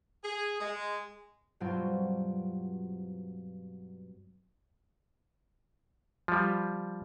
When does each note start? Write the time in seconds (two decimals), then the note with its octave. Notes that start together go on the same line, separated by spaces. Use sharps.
0.24 G#4
0.60 G#3
1.60 G2 B2 F#3 C4 F4 C6
6.28 F3 G3